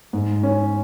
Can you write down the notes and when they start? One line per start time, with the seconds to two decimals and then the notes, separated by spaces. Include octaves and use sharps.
0.13 G#2
0.43 C#4